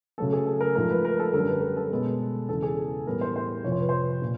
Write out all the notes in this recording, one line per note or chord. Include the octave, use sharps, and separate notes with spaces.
C#3 F#3 A3 A4
G#4
A4
A#4
G#2 F3 A3 A#4
B4
A#4
A4
F#2 D3 G3 A#4
B4
A#4
A4
B2 G#3 B3
E2 C#3 E3 A4
G#4
A2 E3 G3 B3 A#4
C5
C5
F2 C3 F3 C#5
C5
B4
C5
A#2